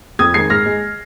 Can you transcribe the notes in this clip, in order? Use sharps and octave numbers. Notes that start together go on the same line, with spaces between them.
F2 D#6 G#6
D#3 G#3 G#6 C7
G#2 F6 A#6
G#3